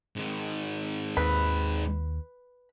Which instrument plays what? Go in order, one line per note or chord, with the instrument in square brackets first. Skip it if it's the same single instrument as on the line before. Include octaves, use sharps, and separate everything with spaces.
[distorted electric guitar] G#2 D#3
[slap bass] D#2 [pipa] B4